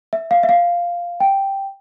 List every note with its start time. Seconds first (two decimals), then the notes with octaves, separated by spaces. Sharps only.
0.13 E5
0.31 F5
0.43 E5
0.49 F5
1.20 G5